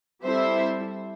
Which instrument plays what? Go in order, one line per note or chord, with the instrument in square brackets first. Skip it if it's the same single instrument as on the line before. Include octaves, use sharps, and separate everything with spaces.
[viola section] G3 C4 E4 A4 [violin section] C5 E5